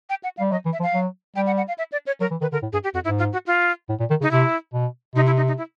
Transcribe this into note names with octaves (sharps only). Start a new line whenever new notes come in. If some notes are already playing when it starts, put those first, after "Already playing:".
G5
F#5
F5
G3
F#3 D#5
E3
E5
F3
F5
F#3
G3 G5
F#5
F#5
F5
E5
D5
C#5
F#3 A#4
E3
D#3 B4
D3 A#4
A2
G2 G#4
G4
F2 F#4
G#2 E4
F4
F#4
F4
A2
A#2
D#3
C#3 D#4
C3 E4
B2
C3 D#4
E4
D#4
D#4
E4